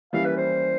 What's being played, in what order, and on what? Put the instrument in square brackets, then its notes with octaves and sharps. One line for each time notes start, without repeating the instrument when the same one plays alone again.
[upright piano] E3 G3 A#3 C#4 E4 [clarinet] F5
[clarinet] B4
C5